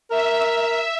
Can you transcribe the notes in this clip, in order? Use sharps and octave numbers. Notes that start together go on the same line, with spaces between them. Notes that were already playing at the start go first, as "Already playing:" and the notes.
A#4 E5